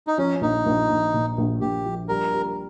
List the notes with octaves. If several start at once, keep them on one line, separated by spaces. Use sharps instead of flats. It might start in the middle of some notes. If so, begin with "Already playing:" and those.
D#4
F3 C#4
A#1 D#4
A#1
A#1
A#2
A#1
A#1 G4
F3
G3 A#4
G3